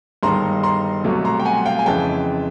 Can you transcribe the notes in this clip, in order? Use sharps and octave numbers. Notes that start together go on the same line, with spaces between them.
G1 G2 D#3 G#3 A#5 C6
A#5 C6
C2 B2 F#3 A3
A#5 C6
G5
F#5 G#5
F5 G5
G#5
F2 C#3 E3 G#3 G5 A5